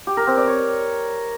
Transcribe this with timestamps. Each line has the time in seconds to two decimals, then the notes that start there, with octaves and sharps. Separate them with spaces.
0.07 G4
0.17 A#4
0.27 C4
0.37 D5
0.47 C#5